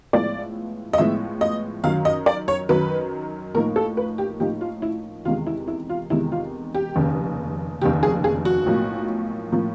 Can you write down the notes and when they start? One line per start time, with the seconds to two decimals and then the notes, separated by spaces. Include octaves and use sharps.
0.13 A2 F3 G#3 B3 E4 D5
0.93 D#5
0.98 A2 F3 G#3 B3 E4 E5
1.41 D#5
1.84 F#2 D#3 F#3 F5
2.05 D#5
2.26 D5
2.48 C#5
2.69 F#2 D#3 F#3 B4
3.54 A2 F3 A#3 D#4 A#4
3.76 A4
3.97 B4
4.18 G4
4.40 A2 F3 A#3 D#4 G4
4.61 F4
4.82 E4
5.25 E2 C3 D#3 G#3 F4
5.47 E4
5.68 E4
5.89 F4
6.10 E2 C3 D#3 G#3 E4
6.32 F4
6.75 G4
6.96 F1 D#2 C#3
7.81 F1 D#2 C#3 G4
8.03 G#4
8.24 G#4
8.45 F#4
8.66 B1 A2 F3 A#3
9.52 A2 F3 A#3